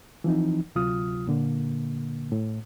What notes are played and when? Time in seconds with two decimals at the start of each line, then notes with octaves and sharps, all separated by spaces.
0.24 E3 F3 C4 D#4
0.75 D2 C3 F#3 F4 D#6 F6
1.27 A#2 D3 A#3
2.32 A2